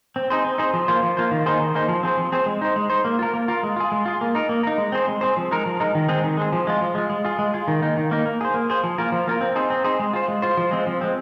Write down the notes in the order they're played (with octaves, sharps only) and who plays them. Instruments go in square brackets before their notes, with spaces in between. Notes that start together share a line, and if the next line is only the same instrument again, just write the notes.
[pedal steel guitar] C4
D#4 G#4 C5
C4
D#4 G#4 C5
F3
A#3 F4 C5
F3
A#3 F4 C5
D#3
A#3 D#4 G#4 C5
D#3
A#3 D#4 G#4 C5
F3
C4 G#4 C5
F3
C4 G#4 C5
G#3
D#4 C5
G#3
D#4 C5
A#3
F4 A#4
A#3
F4 A#4
G#3
F4 G#4
G#3
F4 G#4
A#3
D#4 A#4
A#3
D#4 A#4
G#3
C4 G#4 C5
G#3
C4 G#4 C5
F3
G#3 D#4 A#4
F3
G#3 D#4 A#4
D#3
G#3 C4 G#4
D#3
G#3 C4 G#4
F3
G#3 F4
F3
G#3 F4
G#3
F4 G#4
G#3
F4 G#4
D#3
A#3 D#4
D#3
A#3 D#4
A#3
G#4 C5
A#3
G#4 C5
F3
A#3 F4 A#4
F3
A#3 F4 A#4
C4
D#4 G#4 C5
C4
D#4 G#4 C5
G#3
F4 C5
G#3
F4 C5
F3
G#3 C4
F3
G#3 C4